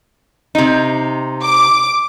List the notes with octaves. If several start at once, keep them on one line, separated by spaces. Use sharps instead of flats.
C3 D#4
D6